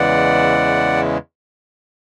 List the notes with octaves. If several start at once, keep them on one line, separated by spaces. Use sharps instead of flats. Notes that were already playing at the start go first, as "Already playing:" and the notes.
Already playing: E2 C#3 E3 G#3 D5 F#5